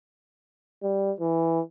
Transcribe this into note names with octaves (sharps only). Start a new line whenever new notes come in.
G3
E3